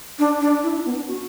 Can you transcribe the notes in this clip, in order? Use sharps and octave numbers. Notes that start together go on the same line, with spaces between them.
D4
D4
E4
D4
B3
D4
F#4